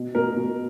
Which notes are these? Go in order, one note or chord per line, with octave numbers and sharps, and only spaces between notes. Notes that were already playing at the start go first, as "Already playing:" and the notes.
Already playing: B2
B2 A#4
B2